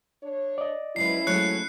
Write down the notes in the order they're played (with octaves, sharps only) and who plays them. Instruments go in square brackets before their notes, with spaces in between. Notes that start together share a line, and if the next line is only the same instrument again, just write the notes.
[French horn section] D4 C#5
[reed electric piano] D5 D#5
[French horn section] F3 C#4 E4 [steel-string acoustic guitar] F#3 G#3 B4 [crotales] C7
[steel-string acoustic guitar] F#3 G#3 A3 [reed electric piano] C#5 [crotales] F#6 C#7